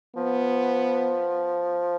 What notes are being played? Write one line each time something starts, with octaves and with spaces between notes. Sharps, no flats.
F3 B3